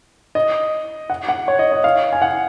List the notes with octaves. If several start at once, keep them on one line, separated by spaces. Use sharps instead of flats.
D#5
F#5
F#5
C#5
D#5
D#5
F5
G#5
F#5